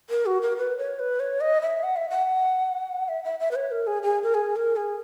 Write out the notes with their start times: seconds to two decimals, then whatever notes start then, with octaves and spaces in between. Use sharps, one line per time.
0.10 A#4
0.26 F#4
0.42 A#4
0.57 B4
0.78 C#5
0.99 B4
1.20 C#5
1.41 D#5
1.62 E5
1.83 F#5
1.96 E5
2.10 F#5
3.08 E5
3.24 E5
3.40 E5
3.51 B4
3.56 C#5
3.71 A#4
3.87 G#4
4.03 G#4
4.23 A#4
4.34 G#4
4.56 A#4
4.76 G#4